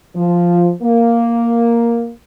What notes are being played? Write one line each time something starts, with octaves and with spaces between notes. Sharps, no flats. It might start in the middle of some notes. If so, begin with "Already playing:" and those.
F3
A#3